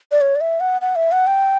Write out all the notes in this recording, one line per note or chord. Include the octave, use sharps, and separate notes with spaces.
D5
C#5
D5
E5
F#5
F#5
E5
F#5
G5